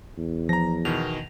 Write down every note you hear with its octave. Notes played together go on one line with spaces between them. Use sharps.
E2
F3 A#5 A#6
B2 D#3 E3 F7